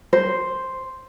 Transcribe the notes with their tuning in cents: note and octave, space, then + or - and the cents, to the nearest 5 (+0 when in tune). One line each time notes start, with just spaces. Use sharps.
C5 +0